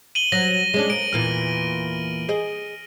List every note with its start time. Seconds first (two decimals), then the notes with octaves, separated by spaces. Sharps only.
0.15 D#7 F#7 G7
0.32 F#3 A#6
0.74 G#3 C#4 D4
0.90 A#3 D7
1.13 E2 A#2 E3 F6
2.29 G#4 D#5